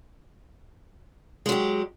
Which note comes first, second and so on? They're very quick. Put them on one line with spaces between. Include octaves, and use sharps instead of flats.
G#3 F#3 G4